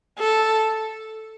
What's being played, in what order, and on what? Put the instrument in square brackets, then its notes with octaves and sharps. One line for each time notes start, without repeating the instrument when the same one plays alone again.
[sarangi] A4